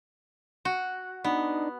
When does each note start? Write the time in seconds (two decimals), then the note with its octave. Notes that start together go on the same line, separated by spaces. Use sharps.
0.65 F#4
1.24 B3 D4 D#4